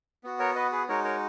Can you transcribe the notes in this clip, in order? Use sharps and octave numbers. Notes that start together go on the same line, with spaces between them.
B3 F#4
A#4 C#5
B4 D#5
G#4 B4
G#3 D#4 F#4 A#4 C#5
A#4 C#5